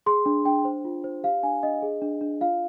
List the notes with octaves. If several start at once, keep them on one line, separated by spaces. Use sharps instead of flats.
G#4 C6
D4
D4 G5
C5
F4
C5
G4 F5
D4 G#5
D4 D#5
G#4
D4
D4
F4 F5